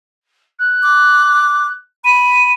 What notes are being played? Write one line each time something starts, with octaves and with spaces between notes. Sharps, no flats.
F#6
D6
B5 D#7